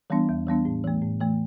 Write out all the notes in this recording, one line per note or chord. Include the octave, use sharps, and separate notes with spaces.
E3 G3 B3 D4
E2
E3 G3 B3 D4
A2
E3 A3
A2
E3 A3